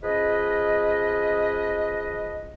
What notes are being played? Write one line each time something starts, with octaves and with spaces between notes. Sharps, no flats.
F3 C#4 G#4 B4 D#5